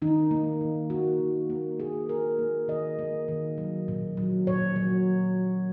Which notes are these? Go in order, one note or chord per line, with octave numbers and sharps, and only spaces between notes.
D#3 D#4
A#3
D#3
A#3 F#4
D#3
A#3
A#3 G#4
A#3 A#4
A#3
D#3 D#5
A#3
D#3
F#3
A#2
F#3
A#2 C#5
F#3